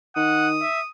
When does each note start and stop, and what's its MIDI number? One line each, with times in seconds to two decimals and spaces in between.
0.16 0.63 51
0.16 0.48 78
0.16 0.89 87
0.62 0.80 76